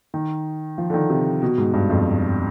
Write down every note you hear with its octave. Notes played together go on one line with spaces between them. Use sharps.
D#3
F3
D3
D#3
C3
B2
G#2
G2
F2